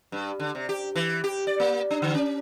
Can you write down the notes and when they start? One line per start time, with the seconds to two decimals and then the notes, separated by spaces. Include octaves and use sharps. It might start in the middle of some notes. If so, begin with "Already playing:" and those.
0.12 G2
0.39 D3
0.55 C3
0.69 G4
0.96 E3
1.24 G4
1.47 D5
1.60 A#3
1.91 D4
2.02 D3
2.15 C#4